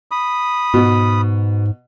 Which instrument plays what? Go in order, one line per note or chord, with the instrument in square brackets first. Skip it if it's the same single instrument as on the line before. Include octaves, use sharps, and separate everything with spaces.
[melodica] B5 D#6
[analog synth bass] G#2 [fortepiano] B2